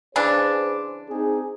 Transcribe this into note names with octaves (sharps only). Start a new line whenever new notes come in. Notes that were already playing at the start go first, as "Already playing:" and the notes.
C#3 E3 D4 G#4 B4 C5
C4 D#4 G#4